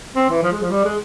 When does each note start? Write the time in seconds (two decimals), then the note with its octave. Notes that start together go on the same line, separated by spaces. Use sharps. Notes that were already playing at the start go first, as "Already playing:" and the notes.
0.15 C4
0.29 E3
0.43 F3
0.51 G#3
0.61 F3
0.70 G3
0.85 G#3